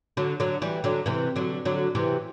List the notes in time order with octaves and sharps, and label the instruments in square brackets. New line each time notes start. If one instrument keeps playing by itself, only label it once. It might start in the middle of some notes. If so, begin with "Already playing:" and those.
[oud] D3 F#3
D3 F#3
E3 G3
D3 F#3
C3 E3
D3 F#3
D3 F#3
C3 E3